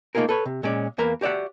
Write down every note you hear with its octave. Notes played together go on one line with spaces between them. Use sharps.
A3 A#3 D#4 F4 G#4 A#4
A4 B4 C#5
C3
A#2 G#3 C#4 D5
E2 A#3 A#4 B4 F5 A#5
F#4 G4 D5 E5 F#5